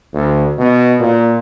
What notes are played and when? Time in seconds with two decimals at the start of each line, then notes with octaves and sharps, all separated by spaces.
0.14 D2
0.59 B2
1.00 A#2